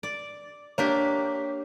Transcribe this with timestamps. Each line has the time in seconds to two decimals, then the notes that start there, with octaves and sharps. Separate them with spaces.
0.03 D5
0.78 A#3 D4 G4 C#5 B6